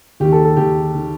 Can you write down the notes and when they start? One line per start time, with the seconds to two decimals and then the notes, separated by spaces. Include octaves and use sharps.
0.20 D#2 D#3 G4
0.32 A4
0.45 A4
0.57 D#2 D#3 G4
0.94 D#3